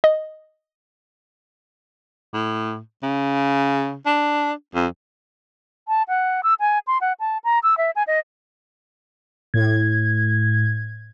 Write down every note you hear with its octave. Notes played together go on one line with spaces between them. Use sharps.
D#5
A2
C#3
D4
F2
A5
F#5
E6
G#5
C6
F#5
A5
A#5
E6
E5
G#5
D#5
A2 G#6